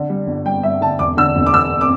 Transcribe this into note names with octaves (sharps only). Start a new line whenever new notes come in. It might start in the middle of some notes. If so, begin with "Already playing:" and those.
Already playing: D3
G3
G1
G3 G5
G2 E5
D3 A5
E1 D6
D3 E6
E1
D6
E1 E6
D6